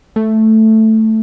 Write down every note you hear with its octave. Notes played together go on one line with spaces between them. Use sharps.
A3